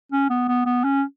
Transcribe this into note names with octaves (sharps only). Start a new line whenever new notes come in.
C#4
B3
B3
B3
C#4